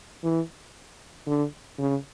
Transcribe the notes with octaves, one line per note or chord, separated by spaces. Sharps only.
E3
D3
C#3